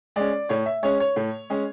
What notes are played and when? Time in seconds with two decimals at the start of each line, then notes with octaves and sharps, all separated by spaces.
0.16 G#3 C#4 D5
0.49 A2 C#5
0.66 E5
0.83 G#3 C#4 C#5
1.00 C#5
1.16 A2
1.50 G#3 C#4